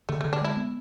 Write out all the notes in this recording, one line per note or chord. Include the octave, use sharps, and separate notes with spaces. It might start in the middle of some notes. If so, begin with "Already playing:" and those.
D3 A3
D3 A3
D4
G#3 E4
B3